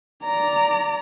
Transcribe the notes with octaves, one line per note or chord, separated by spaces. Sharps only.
D5 A#5